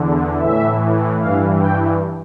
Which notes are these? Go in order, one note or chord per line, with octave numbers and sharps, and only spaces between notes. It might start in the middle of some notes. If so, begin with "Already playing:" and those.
Already playing: E2 D3
A2 E3 E5
G2 E3 F5
G5